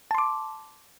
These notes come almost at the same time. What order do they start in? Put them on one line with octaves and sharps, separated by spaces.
A5 C6 D6